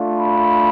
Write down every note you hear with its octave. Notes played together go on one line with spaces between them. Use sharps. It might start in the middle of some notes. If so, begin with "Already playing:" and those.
Already playing: A3 D4 F4
B5